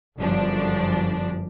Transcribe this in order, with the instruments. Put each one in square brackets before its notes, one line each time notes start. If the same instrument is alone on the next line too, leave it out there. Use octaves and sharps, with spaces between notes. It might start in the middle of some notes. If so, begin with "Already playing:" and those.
[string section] G1 F#2 F3 D4